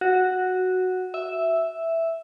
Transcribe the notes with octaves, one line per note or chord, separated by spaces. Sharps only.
F#4
E5